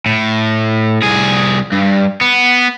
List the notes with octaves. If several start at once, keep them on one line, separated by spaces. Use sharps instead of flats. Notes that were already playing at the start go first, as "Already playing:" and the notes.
A2
C2 G#4
G2
B3